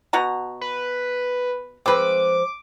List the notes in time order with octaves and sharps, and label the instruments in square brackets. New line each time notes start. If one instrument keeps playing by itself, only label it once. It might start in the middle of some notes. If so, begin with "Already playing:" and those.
[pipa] B2 F#4 A#5
[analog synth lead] B4
[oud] F3 G#3 [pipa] C4 B4 [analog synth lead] D6